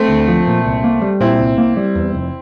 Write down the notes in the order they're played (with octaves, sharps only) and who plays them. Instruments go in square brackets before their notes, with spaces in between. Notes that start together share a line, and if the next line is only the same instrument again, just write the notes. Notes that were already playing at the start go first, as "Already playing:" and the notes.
Already playing: [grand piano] A3 C4
[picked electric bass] D2
F3
A#2
C2
A#3
G3
[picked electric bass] A#2 [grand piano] C4 E4
[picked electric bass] C2
A#3
G3
E2
F1